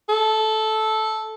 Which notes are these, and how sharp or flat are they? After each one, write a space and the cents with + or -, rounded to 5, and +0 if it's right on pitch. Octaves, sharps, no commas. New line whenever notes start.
A4 -10